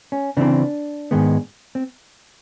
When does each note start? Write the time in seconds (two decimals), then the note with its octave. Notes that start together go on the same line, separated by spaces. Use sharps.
0.12 C#4
0.37 C#3 E3 A3 C4 D4
1.11 G#2 D#3 G#3 B3
1.75 C4